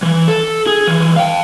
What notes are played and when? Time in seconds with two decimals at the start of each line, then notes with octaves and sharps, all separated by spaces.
0.03 E3
0.28 A4
0.67 G#4
0.87 E3 F3
1.16 F5 G5